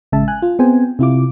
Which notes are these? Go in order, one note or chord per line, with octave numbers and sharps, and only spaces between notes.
A1 C#3 G#3 E5 A5
G#5 F#6
F4
B3 C4 G#4 C5 G5 G#5
C3 E4 F4 D6